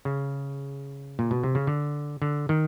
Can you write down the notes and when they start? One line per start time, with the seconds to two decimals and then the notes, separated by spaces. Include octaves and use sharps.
0.05 C#3
1.19 A#2
1.31 B2
1.43 C3
1.55 C#3
1.67 D3
2.22 D3
2.49 D#3